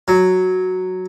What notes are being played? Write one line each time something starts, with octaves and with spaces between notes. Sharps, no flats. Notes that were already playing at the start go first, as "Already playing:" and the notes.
F#3